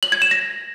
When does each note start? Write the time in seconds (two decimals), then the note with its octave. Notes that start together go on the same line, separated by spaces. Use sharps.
0.03 F#7
0.12 G#6
0.22 E7
0.31 A#6